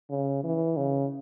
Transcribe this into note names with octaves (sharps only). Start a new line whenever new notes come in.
C#3
E3
C#3